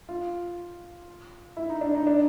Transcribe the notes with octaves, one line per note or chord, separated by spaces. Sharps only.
F4
E4
D#4
D4
D#4
D4